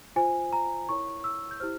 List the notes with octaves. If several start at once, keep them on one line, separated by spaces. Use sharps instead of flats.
F4 C5 G#5
A#5
E4 A#4 C#5 C#6
E6
G6
E4 G4 C5 F6